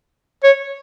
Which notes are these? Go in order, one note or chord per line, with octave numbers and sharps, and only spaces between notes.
C#5